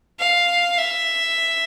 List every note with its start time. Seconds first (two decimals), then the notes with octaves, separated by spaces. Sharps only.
0.19 F5
0.78 E5